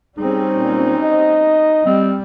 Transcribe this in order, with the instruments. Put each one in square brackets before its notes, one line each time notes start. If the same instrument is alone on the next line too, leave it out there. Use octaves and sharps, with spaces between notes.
[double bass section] G3 C4 C#4 [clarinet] D#4 [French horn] G#4
[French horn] A#2
D#5
[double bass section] G3 [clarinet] C4